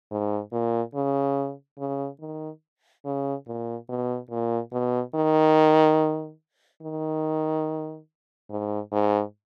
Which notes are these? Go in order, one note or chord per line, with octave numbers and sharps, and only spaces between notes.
G#2
A#2
C#3
C#3
D#3
C#3
A#2
B2
A#2
B2
D#3
D#3
G#2
G#2